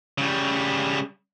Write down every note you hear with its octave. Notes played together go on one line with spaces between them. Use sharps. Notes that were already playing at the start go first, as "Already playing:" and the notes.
C#3 G3